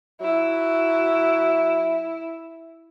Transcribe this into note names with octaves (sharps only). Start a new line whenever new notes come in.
F#3 E4